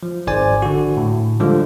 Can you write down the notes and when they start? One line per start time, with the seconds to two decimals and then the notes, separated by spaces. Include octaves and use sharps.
0.03 F3
0.27 G#1 C5 D5 G#5
0.62 D3 F#4
0.97 A2
1.40 D3 F3 G3 G#3 F4